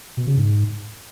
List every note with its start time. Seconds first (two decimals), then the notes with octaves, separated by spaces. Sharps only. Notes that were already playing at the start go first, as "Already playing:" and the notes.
0.17 B2
0.27 C#3
0.37 G#2